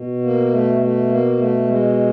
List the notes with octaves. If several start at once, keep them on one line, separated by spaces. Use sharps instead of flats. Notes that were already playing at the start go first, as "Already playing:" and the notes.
Already playing: B2
A#3
A3
A3
A#3
A3
G#3